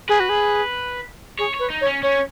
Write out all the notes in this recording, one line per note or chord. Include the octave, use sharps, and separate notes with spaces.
G#4 B4
F#4
G#4
G#4 C#5
C#5
B4
D#4
C#5
C#4
C#4 C#5